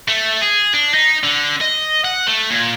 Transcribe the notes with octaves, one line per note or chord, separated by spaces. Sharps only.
A3
G#4
D4
D#4
D3
D#5
F#5
A3
A#2